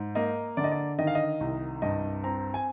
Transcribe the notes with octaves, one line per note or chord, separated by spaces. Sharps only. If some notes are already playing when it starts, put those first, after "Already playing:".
Already playing: G#2
A#3 D#5
D3 D5
D#5
D5
D#3 D#5
F5
D#5
C2
G2 D#5
C4 A#5
G#5